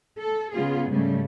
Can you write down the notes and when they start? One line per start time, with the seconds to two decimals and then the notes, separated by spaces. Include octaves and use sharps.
0.18 A4
0.53 C#3 B3 F4 G#4
0.88 G#2 C#3 G3 A3